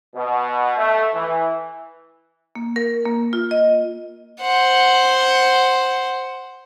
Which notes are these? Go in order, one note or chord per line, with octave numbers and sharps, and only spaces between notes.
B2
A3
E3
A#3
A#4
A#3
F4
D#5
C5 F#5